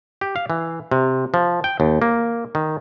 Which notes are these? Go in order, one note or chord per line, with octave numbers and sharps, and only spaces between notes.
G4
F5
E3
C3
F3
G5
D#2
A#3
D#3